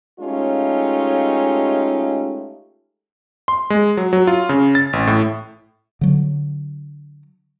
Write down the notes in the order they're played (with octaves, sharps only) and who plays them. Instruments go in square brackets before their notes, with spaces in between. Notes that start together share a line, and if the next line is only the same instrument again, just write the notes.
[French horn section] G#3 A3 C#4 D#4 F4 G4
[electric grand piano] C6
G#3
F#3
F#3
F4
C#3
A6
A1
A2
[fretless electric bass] D3 F#3